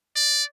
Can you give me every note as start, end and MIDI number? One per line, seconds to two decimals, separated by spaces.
0.16 0.44 74